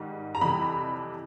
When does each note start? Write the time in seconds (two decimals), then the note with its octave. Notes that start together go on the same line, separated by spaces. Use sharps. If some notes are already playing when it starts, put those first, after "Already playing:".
Already playing: G#2 D#3 G3
0.35 A#5
0.41 F2 C3 E3 G3 B5